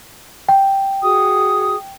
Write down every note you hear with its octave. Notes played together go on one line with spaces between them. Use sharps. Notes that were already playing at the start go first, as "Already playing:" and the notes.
G5
F#4 G#4 D#6